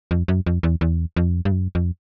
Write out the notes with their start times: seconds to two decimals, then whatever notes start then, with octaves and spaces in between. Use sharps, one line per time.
0.11 F2
0.28 F#2
0.46 F2
0.63 E2
0.81 E2
1.17 F2
1.45 G2
1.52 F#2
1.75 F2